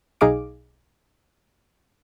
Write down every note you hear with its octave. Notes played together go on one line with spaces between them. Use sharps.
B1 D#4 G#4 F5 D6 D7